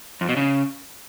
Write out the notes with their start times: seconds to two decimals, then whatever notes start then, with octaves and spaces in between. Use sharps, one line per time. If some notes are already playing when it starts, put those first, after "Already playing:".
0.21 F2
0.29 B2
0.37 C#3